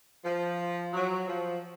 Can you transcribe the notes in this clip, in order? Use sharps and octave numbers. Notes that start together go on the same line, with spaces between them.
F3
F#3
F3